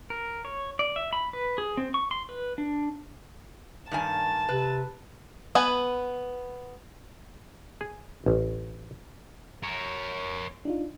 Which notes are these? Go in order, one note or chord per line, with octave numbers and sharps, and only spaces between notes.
A#4
C#5
D5
E5
B5
B4
G#4
C4
C#6
C6
B4
D4
G2 D#3 G#5 A5
C3 B4
B3 B4 G#5
G#4
A1
A#4 C#5
D4 D#4 F4